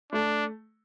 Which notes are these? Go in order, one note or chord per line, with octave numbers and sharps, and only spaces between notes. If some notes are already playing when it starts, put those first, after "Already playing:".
A3 D4